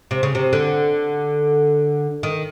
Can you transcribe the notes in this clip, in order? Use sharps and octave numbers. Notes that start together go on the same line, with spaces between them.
C3
C#3
C3
D3
D#3